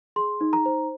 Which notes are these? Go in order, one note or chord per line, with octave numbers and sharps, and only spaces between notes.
G#4 C6
D#4
A#5
C5